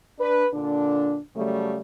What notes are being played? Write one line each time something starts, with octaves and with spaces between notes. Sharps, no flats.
D4 B4
A#2 D3 D4
C#3 F#3 G3 A3